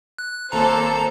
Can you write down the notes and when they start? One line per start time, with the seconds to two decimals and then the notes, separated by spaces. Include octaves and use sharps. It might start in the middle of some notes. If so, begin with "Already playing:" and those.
0.18 F#6
0.52 G#1 A#3 A4 C5 A#5